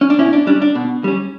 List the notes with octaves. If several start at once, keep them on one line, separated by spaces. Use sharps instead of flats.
C#4
D4
B2 C#4 E4
D4
G3 C#4 D4
D4
B2
G3 C#4